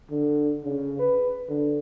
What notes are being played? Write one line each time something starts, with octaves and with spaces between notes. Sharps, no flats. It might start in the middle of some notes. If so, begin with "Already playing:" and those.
D3
C#3
B4
D3